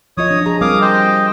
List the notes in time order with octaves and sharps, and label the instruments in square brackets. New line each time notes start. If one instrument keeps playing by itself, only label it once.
[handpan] F3 F4 D#5 [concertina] C#5 D#6
[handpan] D4
[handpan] G#4 [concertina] A#5
[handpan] G3 C4 A#4 [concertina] F5 D6 D#6
[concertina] C5 D#5 G5